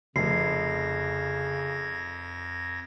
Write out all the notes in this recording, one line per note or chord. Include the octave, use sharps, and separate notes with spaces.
F1 F2 C#3 G#6 A#6 C7